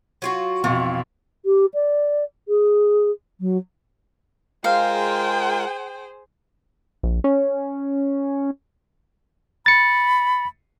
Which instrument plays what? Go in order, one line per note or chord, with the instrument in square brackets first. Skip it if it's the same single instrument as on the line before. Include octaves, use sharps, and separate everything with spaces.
[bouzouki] F#3 F4 F#4
[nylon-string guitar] F2 [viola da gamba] B2 [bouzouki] E3 [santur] F4 C#6
[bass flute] G4
D5
G#4
F#3
[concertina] G#3 F4 A#4 [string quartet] G#4 C5 [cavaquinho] F5 [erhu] G5
[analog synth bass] A#1
C#4
[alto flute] B5 [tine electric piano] A6 C#7